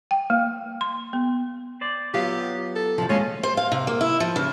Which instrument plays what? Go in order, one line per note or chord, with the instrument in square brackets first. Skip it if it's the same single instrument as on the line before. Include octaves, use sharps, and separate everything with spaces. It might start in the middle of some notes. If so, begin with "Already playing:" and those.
[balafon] G5
A#3
C6
B3
[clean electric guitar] C5 D5
[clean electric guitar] F#3 B3 [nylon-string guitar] F4 F5 [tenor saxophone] G4
[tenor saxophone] A4
[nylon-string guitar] F#2 C3 F3
[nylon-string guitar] D#2 G#3 [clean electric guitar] A2 F4 [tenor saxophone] C#4
[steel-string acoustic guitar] C5
F5
C3
A#3
E4
F3
C#3